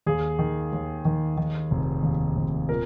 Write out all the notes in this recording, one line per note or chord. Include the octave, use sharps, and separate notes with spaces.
D#2 G#4
D#3
D#2
D#3
D#3
F1
D#2
F1
A#2 A#4